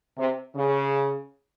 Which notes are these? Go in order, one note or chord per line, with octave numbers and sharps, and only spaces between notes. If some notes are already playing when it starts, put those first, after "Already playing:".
C3
C#3